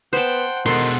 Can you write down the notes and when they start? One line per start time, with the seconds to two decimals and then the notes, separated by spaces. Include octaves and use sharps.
0.13 B3 C5 F#5 G5 A5
0.66 B2 D#3 G#3 A4 F#5 C6